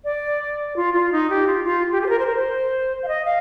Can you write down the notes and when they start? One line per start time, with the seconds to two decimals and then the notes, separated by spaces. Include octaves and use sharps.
0.04 D5
0.76 F4
0.94 F4
1.12 D#4
1.30 G4
1.47 F4
1.64 F4
1.92 G4
2.01 G#4
2.06 C5
2.09 A#4
2.19 C5
2.26 A#4
2.36 C5
3.03 F5
3.08 D#5
3.25 F5